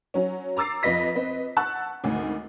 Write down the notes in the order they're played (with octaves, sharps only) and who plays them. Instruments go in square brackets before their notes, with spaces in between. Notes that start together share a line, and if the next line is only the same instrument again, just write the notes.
[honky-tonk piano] F#3 C#4
A#5 D6 E6 A6 C7
F2 F4 B4 D#5 A#6 B6
C4 B4 D#5
F#5 A5 C#6 E6 F#6
G#1 D2